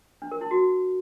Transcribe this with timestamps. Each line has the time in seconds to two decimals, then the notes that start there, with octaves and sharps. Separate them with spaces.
0.22 D4
0.31 A#4
0.41 E4
0.51 F#4